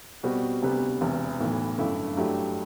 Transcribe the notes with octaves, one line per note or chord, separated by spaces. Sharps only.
B2 G3 C4 F#4
D2 C3 G3 B3
E1 E2 C3
B1 A2 E3 B3
G1 F#2 D3 A3 E4
G2 F#3 A3 E4 G4